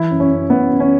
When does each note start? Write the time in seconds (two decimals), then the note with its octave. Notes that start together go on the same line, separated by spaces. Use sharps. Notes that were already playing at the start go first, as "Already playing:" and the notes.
Already playing: E3 E4
0.11 F#2
0.20 C#4
0.30 F#2
0.50 F#2 B3
0.70 F#2
0.80 C#4